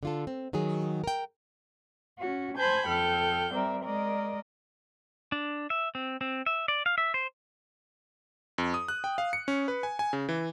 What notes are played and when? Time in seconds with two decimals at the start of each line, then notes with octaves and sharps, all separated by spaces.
0.03 D3 F4 A4
0.27 C4
0.53 D#3 F#3 F#4 G#4
1.04 A#4 G5
2.19 C#4 F#4
2.58 C5 G#5 A5 B5 G6 G#6
2.88 F2 A4 G5 F6 G6
3.54 G3 C4 A#4 D5 E5
3.85 G#3 A#4 D5 D#5
5.32 D4
5.70 E5
5.95 C4
6.21 C4
6.46 E5
6.68 D5
6.86 F5
6.98 E5
7.14 C5
8.58 F2
8.74 D#6
8.88 F#6
9.04 G5
9.18 F5
9.33 C#7
9.48 C#4
9.68 B4
9.83 G#5
9.99 G#5
10.13 C#3
10.29 E3